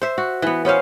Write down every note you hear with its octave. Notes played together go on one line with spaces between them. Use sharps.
C5 E5
F#4
E3 B3
B3 C#4 C5 F5